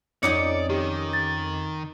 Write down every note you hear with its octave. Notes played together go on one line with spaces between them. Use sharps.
F2 C#4 D#4 D5 D#5 D6 D#6 C#7
D#3 G4
A6